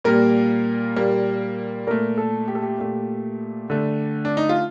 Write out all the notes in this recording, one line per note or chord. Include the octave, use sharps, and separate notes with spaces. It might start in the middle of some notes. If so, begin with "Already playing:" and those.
A#2 G3 A#3 A#4
A#2 G3 A#3
A#2 A3 A#4
A4
G4
A4
G4
A#2 A3
D3 A3
D4
D#4
F4